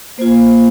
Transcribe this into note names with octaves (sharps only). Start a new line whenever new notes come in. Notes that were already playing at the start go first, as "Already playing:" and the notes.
A#3 F4 C5